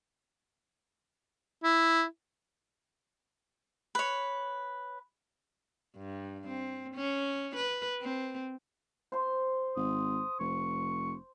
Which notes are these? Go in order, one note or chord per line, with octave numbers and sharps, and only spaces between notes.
E4
B4 C#5
G2
C4
C#4
B4
C4
C5 C6
G#1 D#6
F1 C#6